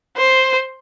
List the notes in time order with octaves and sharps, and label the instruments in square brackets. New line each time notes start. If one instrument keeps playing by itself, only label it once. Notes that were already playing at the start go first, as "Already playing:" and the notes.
[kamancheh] C5